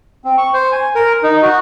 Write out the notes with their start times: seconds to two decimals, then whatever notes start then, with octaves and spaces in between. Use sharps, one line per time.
0.24 C4
0.38 C#6
0.54 C5
0.72 G#5
0.95 A#4
1.23 D#4
1.42 F#4